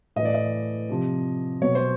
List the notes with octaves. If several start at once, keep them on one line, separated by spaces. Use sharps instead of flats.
A2 E3 D#5
D5
D#5
C3 F3
B2 F#3 C#5
C5